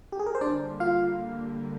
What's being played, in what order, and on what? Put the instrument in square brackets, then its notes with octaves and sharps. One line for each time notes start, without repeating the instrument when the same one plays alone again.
[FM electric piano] G4
G#4
A#4
C5
[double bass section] D3 G3 A#3 [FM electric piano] D4 D5
[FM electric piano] F4 F5